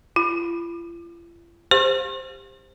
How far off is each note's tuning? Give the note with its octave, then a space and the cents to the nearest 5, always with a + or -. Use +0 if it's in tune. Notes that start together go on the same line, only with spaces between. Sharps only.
F4 -45 B5 +0
G4 +25 C5 +0 C6 +45